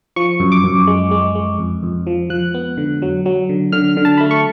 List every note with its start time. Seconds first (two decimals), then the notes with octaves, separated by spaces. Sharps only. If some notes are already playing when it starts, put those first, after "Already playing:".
0.16 F3 C#6
0.40 F#2
0.52 D6
0.64 F#2
0.87 G#3
1.11 G#3
1.35 G#3
1.59 F2
1.83 F2
2.07 F3
2.30 F3 F#6
2.54 B3
2.77 D3
3.02 F#3
3.26 F#3
3.49 D3
3.72 D3 F6
3.97 D3
4.05 A5
4.17 A3 B5
4.31 C#6